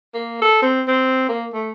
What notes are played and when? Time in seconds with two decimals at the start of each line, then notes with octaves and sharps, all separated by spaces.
0.14 A#3
0.42 A4
0.63 C4
0.88 C4
1.29 A#3
1.54 A3